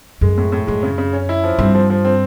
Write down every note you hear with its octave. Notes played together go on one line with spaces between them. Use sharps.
F#2 G#3
A2
A2
F#2 G#3
C#3
C#3
C#4
E4
F3
G2 C4
F3
F3
C4